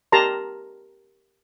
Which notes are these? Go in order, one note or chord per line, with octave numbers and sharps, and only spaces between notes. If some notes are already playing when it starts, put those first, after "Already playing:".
G4 A#4 A5 A#5 C6